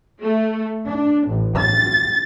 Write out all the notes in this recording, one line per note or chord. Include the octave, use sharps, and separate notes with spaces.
A3
D4
A1
A6